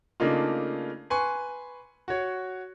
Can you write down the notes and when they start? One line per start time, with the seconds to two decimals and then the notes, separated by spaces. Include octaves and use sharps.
0.20 C#3 A3 A#3 D4 D#4 F4
1.10 B4 G#5 C6 C#6
2.08 F#4 C#5